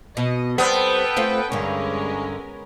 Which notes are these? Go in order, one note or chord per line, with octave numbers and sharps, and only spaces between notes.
B2 D#5
G3 B3 C4 A4 B4 G5
A3 C4 F4
G2 D3 G#3 C#4 A#4